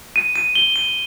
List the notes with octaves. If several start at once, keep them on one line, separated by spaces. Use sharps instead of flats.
D#7
D#7
G7
D#7